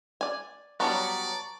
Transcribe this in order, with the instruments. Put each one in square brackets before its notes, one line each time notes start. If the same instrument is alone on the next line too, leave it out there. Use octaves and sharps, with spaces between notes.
[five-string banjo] D5 G#5
[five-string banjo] F#3 G3 B3 [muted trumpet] D5 [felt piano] A5 A#5 C#6